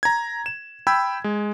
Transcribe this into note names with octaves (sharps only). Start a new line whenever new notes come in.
A#5 G#6
E7
G5 B5 E6 G#6
G#3